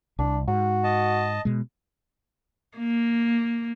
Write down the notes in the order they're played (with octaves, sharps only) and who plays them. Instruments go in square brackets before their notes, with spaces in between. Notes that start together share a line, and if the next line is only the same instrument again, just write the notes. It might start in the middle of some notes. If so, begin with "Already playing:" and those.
[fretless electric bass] C2 [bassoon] D4
[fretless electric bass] G#2 [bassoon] F#4
[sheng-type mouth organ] D#5 A5
[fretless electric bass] B2 G#3
[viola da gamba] A#3